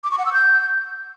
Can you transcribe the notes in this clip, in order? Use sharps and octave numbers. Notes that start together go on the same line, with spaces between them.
D6
C#6
F#5
E6
G6